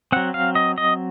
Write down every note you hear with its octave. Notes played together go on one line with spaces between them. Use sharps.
F#3 C4 F#5
F5
D#5
D#5